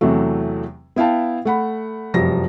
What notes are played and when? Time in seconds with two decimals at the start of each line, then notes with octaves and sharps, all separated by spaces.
0.01 E2 C3 E3 F#3 A3
0.96 B3 E4 F5 G5 A5
1.45 A3 F#5 B5
2.14 F1 F#2 F3 G3 A#6